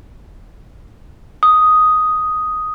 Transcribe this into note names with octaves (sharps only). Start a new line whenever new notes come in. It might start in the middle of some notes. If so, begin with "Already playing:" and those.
D#6